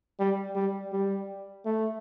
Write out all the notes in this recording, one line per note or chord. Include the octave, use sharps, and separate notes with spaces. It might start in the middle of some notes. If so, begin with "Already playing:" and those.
G3
G3
G3
A3